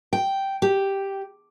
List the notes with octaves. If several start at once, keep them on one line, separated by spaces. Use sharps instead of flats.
G5
G4